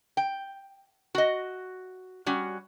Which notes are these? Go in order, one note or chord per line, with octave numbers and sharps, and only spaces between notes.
G5
F#4 D#5
G3 C#4 F#4